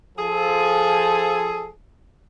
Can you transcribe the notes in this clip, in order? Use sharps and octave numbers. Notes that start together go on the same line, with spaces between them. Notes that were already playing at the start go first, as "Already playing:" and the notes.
F3 G#4 A4